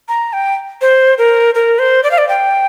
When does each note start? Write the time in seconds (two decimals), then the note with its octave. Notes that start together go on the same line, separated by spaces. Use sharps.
0.09 A#5
0.33 G5
0.81 C5
1.18 A#4
1.55 A#4
1.79 C5
2.04 D5
2.11 F5
2.18 D5
2.29 G5